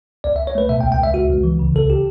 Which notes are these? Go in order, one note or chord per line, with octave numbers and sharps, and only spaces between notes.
C#2 D5
E5
C#2
C#5
A3 B4
B2 E5
G5
C#2
G5
C#2 E5
C#2 F#4
C#2
E3
C#3
C#2 A4
G4